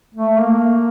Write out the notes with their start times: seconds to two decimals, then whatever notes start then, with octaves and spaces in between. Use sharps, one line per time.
0.15 A3
0.38 A#3